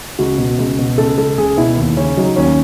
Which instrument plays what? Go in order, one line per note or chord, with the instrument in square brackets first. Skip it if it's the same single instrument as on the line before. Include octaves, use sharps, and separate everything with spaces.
[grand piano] C#2 F#4
B2
C#2
B2
C#2 A4
C#2 A4
C#2 G#4
B2 E4
D#2
C#3 C#4
F#3 D#4
D#2 C#4